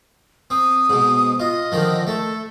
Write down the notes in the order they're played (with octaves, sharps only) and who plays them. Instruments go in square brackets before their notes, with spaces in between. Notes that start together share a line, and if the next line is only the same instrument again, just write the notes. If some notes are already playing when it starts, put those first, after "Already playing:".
[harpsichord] C4 [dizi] D#6
[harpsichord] G#2 B2
[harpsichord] F4 [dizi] D#5
[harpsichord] D3 D#3 F3
[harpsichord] A3 [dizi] A4